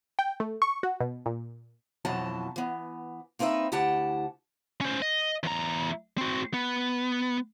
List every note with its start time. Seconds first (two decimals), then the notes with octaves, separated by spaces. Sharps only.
0.19 G5
0.40 A3
0.62 C#6
0.83 F#4
1.00 B2
1.26 A#2
2.05 F2 B2 E3 F#3 A5
2.56 E3 B3
3.39 A#3 C4 D#4 B4 E5
3.72 D2 E4 G4 F#5 A5
4.81 C#4 C5
5.02 D#5
5.43 E2 A#5
6.18 C4 F#4
6.54 B3